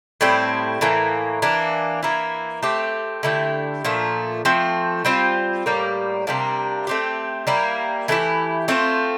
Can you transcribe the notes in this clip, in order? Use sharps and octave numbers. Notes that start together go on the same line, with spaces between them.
A2 G3 C4 E4
A2 E3 A#3
E3 A#3 D4
E3 A#3 E4
A3 C4 G4
D3 A3 E4 G4
A#2 F3 A3
F3 A3 C4
G3 C4 F4 C5
A2 G3 A#3
C3 G3 A#3 D4
A3 C4 G4
G3 A#3 E4
E3 A3 E4 G4
A3 C4 F4 C5